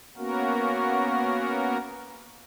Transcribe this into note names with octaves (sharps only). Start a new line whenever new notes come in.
A#3 B3 C#4 F#4 A#4